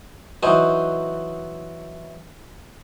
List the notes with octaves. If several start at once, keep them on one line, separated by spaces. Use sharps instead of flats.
E3 F#3 D#4 C5 G#5